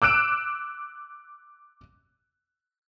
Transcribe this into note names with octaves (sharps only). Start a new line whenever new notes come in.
D6 E6 F#6 D7 E7